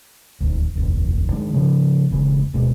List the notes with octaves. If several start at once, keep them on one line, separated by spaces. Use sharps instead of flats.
D#1 D2
F1 A#1 D#2
D#3 G#3 D4
C#3 F3
E1 C#3 E3 G#3
D1 B2 G#3 B3